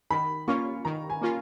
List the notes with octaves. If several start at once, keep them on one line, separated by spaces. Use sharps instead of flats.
D#3 B5
A#3 C#4 F4 C#6
D#3 A#5
G#5
A#3 C#4 F4